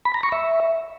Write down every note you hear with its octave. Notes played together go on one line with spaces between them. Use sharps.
B5
A#5
C#6
E5